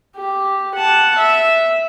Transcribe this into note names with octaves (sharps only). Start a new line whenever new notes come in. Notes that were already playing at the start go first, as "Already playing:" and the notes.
G4
F#5 A5
E5